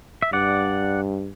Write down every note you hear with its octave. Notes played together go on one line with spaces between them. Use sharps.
E5
G2 D5 F#5